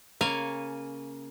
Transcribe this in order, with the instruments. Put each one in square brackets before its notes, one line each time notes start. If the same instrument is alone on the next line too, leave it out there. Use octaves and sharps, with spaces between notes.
[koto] C#3 A#3 C#5 F5 G#5